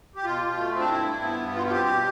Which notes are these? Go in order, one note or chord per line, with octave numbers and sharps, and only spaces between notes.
G4
B2 F4
B2
A3
C4
D4
G2 E4
G2
B3
G2
B2 F4
F4
C4 G4
B2